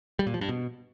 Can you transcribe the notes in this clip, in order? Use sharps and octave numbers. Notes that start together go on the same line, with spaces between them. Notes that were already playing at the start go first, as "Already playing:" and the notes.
G3
A#2
F3
G2
B2